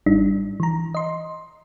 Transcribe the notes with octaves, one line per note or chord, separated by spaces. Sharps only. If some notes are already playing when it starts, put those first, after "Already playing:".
G#1 G3 D4 D#4
E3 A#5
D#5 C6